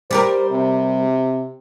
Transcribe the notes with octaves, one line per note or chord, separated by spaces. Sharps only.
G3 G4 A#4 C5
C3